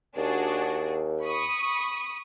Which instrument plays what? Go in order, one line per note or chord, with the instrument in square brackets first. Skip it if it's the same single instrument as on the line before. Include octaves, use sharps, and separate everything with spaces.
[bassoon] D#2 [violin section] D4 F#4 G#4
[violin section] B5 C#6 D#6